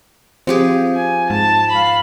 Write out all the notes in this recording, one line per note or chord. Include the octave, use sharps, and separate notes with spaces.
F3 C4 G4 G#4
G#5
G#2 A5
F5 B5